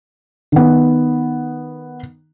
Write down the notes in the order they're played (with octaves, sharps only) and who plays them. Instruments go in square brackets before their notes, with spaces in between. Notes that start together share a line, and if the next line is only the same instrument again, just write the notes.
[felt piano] D#3 B3